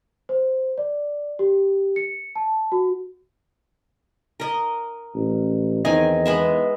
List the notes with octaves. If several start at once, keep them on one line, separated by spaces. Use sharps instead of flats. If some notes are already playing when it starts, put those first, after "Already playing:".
C5
D5
G4
C#7
A5
F#4
A#4 D#5
A1
E2 D#3 C4 D#5 G#5
G#3 B3 E5